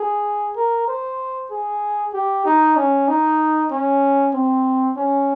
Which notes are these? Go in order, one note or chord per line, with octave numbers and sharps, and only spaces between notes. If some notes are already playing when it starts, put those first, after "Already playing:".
Already playing: G#4
A#4
C5
G#4
G4
D#4
C#4
D#4
C#4
C4
C#4